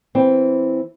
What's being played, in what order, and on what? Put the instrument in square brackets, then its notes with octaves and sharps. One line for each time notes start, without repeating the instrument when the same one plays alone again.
[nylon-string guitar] E3 C4